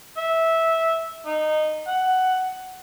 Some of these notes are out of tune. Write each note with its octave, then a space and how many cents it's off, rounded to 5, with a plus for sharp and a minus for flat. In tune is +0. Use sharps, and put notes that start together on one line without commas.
E5 -15
D#4 -15
F#5 +10